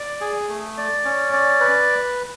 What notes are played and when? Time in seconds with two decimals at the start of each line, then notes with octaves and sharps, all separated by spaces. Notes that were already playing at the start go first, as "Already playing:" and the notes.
Already playing: D5
0.21 G#4
0.49 A3
0.78 D5
1.05 C#4
1.33 D5
1.61 B4